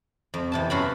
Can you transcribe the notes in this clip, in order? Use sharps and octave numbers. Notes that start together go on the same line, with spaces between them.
F2
E2 C3 A5
F#2 F#3 F#4 F5 A5 B5